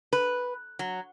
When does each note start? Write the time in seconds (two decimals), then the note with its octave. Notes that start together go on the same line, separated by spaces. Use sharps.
0.13 B4
0.79 F#3